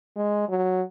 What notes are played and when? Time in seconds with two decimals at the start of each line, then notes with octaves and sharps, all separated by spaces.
0.17 G#3
0.49 F#3